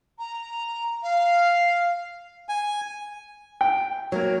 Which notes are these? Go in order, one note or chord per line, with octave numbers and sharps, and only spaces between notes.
A#5
F5
G#5
G5
F#3 G#3 A#3